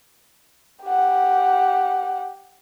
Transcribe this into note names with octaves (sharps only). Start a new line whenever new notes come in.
G4 F#5